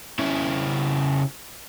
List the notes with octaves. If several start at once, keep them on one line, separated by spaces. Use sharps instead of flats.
C#3 E4